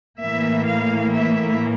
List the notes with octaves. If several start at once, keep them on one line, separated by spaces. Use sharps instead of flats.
A2 E3 A#3 E5
F5
E5